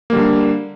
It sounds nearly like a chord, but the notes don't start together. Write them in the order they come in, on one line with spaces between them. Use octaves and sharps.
A#3 G3 D3